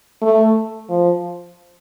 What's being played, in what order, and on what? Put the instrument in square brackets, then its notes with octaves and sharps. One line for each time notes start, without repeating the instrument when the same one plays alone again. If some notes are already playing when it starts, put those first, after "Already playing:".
[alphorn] A3
F3